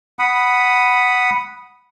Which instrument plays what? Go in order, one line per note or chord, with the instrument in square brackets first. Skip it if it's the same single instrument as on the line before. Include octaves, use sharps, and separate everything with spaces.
[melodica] F#5 B5 D#6